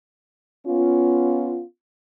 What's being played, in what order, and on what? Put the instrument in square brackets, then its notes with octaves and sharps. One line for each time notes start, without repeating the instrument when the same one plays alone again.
[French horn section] B3 C#4 F4